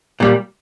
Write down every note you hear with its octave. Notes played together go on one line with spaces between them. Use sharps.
A#2 G3